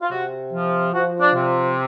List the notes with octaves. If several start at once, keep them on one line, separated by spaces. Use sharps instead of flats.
F4
C3 F#4
F3
F3 F#4
D4
C3